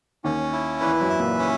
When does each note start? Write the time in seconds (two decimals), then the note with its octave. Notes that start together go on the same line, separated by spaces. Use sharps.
0.24 D#2 D#3 C#4
0.53 E4
0.81 E2 E3 B4
1.01 F#2 F#3
1.10 E5
1.19 A#2 A#3
1.39 C#4